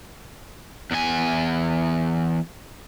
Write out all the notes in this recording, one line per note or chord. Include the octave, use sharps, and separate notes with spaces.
E2 G#5